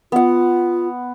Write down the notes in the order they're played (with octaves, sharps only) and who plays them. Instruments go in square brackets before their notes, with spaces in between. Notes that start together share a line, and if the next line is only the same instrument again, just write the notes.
[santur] B3 F#5 [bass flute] F4